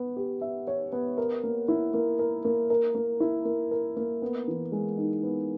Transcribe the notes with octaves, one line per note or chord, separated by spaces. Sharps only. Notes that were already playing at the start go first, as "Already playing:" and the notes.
Already playing: B3
G4
E5
C#5
B3
A#4
A#3
E4
A#3
A#4
A#3
A#4
A#3
E4
A#3
A#4
A#3
B3
E3
G#3
D#4
B3